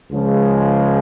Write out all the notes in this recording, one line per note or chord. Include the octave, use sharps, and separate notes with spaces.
C#2 C#3 F3 G#3